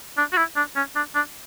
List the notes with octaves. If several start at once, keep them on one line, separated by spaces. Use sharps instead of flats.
D4
F#4
E4
D4
C#4
D4
D4